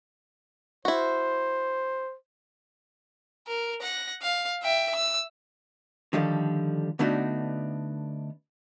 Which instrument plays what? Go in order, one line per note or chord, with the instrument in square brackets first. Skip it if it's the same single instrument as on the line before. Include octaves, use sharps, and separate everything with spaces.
[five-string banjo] E4 F#4 [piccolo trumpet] C5
[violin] A#4
F#5 A#6
F5
E5 G5
E6
[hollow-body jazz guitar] D3 D#3 F3 G3 A4
D3 A3 B3 D4 D#4 F#4